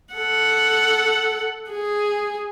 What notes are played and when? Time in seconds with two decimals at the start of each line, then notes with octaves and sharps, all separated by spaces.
0.14 A4 F#5
1.71 G#4